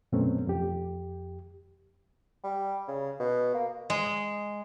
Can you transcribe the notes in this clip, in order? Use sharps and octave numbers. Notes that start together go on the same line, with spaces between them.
F#2 B2 F#3 A3 C4 C#4
F2 G4
G3
C#3
B2
A#3
G#3